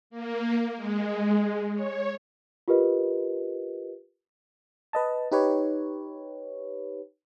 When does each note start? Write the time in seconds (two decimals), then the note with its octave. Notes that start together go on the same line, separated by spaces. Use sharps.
0.10 A#3
0.76 G#3
1.74 C#5
2.68 F4 G4 A#4 B4 D#5
4.93 B4 D#5 A5
5.32 D#4 G4 B4 C#5